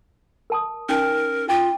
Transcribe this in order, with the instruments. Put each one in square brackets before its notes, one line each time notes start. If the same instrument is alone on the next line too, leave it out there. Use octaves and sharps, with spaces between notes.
[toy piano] A#4 A5 D#6
[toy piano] C#4 D#4 [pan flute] A#4
[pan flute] F4 [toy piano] G5 D6